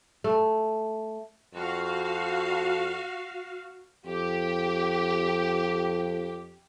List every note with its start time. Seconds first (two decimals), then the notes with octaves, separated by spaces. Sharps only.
0.24 A3
1.54 F2 F#4 F5
4.06 F2 G4